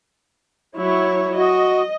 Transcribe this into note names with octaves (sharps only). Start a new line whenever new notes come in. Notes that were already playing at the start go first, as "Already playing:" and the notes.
F#3 E4 C#5
F#4 D#5